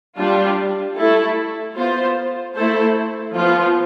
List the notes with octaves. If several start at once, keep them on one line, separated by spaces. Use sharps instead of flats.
G3 D4 F4
A3 E4 A4
B3 F4 C5
A3 E4 A4 C5
F3 B3 F4